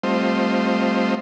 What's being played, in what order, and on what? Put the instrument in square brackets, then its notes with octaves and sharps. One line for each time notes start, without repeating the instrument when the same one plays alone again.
[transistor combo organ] G3 A3 C4 F4 C5 D#5